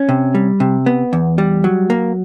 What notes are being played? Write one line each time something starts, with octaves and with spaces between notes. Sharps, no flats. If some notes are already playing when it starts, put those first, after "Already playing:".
Already playing: C#4
C3
G3
C3
B3
E2
G3
F#3
A#3